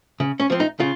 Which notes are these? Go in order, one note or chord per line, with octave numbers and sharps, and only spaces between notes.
C#3
C#4
F3 C4
D#4
C#3 F4